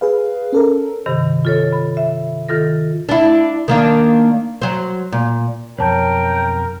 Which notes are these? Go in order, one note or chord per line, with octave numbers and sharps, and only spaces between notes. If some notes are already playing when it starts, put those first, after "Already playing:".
G#4 B4 F5
C#4 A4 A#4
G2 C3 D#3
F4 A4 C#5
B5
E5
D#3 F4 A4 A#6
D4 E4
D#3 A#3 D4
F#3 C5
A#2
B1 F2 A#4 C#5 G5 A5